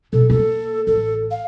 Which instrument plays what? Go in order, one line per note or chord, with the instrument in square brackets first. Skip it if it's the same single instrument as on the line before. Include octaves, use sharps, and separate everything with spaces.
[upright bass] B2 [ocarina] A4
[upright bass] A#3 [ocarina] A4
[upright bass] A1 [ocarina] A4
[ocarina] F5